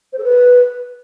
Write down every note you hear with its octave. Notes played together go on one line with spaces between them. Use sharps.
C5
A4
B4